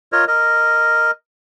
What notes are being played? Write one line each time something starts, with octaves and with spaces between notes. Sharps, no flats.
F4 A#4 C#5 D#5
A#4 D#5